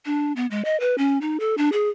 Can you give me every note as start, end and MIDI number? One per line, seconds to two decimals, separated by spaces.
0.06 0.33 62
0.36 0.46 59
0.51 0.62 56
0.65 0.79 75
0.80 0.95 71
0.98 1.18 61
1.22 1.38 63
1.40 1.55 69
1.58 1.69 62
1.73 1.89 68